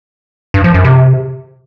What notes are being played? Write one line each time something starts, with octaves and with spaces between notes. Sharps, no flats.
G2
F3
F#2
C3